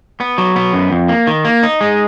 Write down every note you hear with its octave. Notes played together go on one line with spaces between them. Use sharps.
B3
F#3
B3
F#2
F2
A#3
D#3
A#3
D#4
G#3